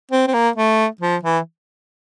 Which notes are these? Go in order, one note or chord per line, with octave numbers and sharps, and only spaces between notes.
C4
C4
A#3
A3
F3
E3